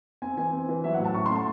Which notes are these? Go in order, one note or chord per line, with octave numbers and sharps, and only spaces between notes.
C4 G#5
E3 G#5
C4
E3
F#3 E5
F#5
A2
A5
C#4 C#6
C6
A3 A5